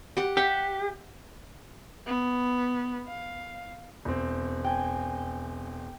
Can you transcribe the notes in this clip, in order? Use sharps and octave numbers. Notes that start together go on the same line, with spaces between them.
G4 F#5
G4 E5 F#5
B3
F5
E1 C4
G5 G#5